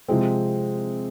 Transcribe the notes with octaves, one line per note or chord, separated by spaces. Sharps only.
C3 F3 G#3 C4